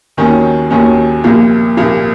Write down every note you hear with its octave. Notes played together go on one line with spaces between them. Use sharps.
D#2 D#3 F#3 C#4
D#2 D#3 F#3 C#4
C2 A#2 F3 A#3
C2 A#2 F3 A#3